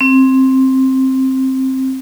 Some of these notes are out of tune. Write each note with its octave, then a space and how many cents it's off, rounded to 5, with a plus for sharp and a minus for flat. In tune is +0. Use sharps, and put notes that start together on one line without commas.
C4 +10